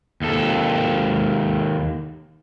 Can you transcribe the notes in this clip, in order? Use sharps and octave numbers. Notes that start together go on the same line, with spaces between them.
D#2 A4